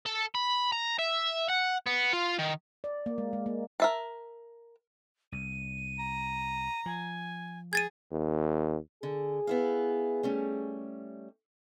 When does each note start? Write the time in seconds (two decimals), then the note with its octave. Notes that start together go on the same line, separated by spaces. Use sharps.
0.06 A4
0.35 B5
0.72 A#5
0.99 E5
1.50 F#5
1.87 B3
2.13 F4
2.38 D#3
2.84 D5
3.06 A#3
3.18 G#3
3.33 G#3
3.46 A#3
3.80 A#4 E5 A5
5.32 C2 D#7
5.99 A#5
6.86 F3 G#5
7.73 G#4 G#6 A6 D#7
8.12 D#2
9.03 D3 G#4
9.47 B3 E4 F5
10.23 G3 A3 C#4